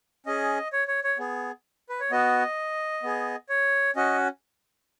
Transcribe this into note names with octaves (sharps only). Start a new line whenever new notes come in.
C#4 G#4 D#5
C#5
C#5
C#5
B3 G#4
B4
C#5
B3 F#4 D#5
B3 G#4
C#5
C#4 F#4 D#5